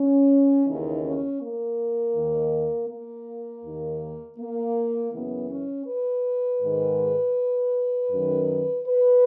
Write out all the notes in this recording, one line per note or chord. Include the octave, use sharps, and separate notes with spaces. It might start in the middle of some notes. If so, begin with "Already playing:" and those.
Already playing: C#4
D#2 C#3 E3 D#4
C#4
A#3
D#2 D#3
A#3
D#2 D#3
A#3
F#2 C#3 E3 B3
C#4
B4
G#2 D#3
F#2 D#3
B4